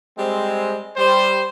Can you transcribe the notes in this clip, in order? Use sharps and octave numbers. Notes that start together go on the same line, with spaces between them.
G3 G#3 C4
G3 C5